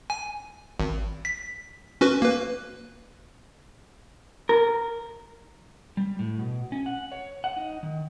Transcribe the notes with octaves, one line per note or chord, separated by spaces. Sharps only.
G#5
G#1
B6
C#4 F#4 B4
A#3 B4
A#4
G3
A2
B2
C#4
F#5
C#5
F#5
D#4
D#3